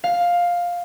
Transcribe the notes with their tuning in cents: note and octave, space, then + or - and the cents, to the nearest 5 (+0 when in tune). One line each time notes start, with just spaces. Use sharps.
F5 +10